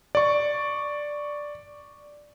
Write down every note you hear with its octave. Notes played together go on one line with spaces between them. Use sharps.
D5 C#6